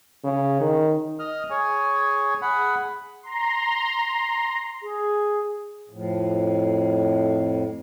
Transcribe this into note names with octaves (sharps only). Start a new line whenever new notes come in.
C#3
D#3
D#5 D#6 F6
G#4 C#5 G#5
G#4 F#5 B5
A#5 C6
G#4
F2 A2